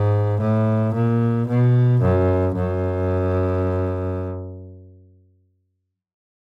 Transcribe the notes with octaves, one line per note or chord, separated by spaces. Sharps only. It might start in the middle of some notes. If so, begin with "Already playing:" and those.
Already playing: G#2
A2
A#2
B2
F#2
F#2